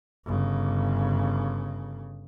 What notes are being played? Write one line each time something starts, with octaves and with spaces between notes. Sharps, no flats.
G1 C#3